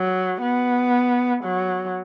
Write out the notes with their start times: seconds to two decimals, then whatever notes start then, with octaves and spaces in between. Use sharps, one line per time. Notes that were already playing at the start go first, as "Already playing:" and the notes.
Already playing: F#3
0.42 B3
1.44 F#3